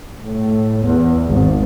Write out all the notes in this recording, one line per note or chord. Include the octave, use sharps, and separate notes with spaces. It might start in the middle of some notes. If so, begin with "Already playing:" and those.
A2
E2
G#1